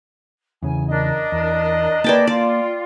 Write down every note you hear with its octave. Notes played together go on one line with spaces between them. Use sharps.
E2 C#3 G#5
D4 A#4 D#5
E2
A#3 G#4 A#4 B4 D5 G5 A5
F4 D5